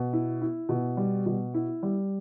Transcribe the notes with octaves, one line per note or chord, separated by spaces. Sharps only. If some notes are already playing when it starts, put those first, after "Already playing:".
Already playing: B2
E4
E4
B2
G3
B2
E4
G3